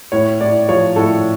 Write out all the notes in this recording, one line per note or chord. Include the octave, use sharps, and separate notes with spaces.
A2 C#5
A2 D5
F3 C#5
A2 A4